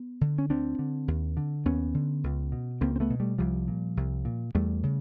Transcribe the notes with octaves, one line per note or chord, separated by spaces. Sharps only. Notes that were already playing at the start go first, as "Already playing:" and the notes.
Already playing: B3
D3
C#4
D2 C4 D4
D3
D#2
D3
D#2 B3 C#4
D3
C#2
B2
C#2 A#3 C4
C4
A3 B3
B2
G3 A3
C2 F3 G3
A#2
C2
A#2
E2 G3 A3
C#3